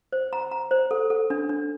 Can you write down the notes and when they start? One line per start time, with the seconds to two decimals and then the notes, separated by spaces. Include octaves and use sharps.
0.12 C5
0.33 A#5
0.51 A#5
0.71 C5
0.91 A4
1.10 A4
1.30 D4
1.49 D4